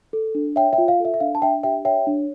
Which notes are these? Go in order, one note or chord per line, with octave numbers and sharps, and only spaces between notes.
A4
D4
C#5 E5 G5
E5 G5
F4
F5
A4 E5
E5
D4 F5
A5
D4 E5 G5
G4 E5 G5
C#5 E5 G5
D4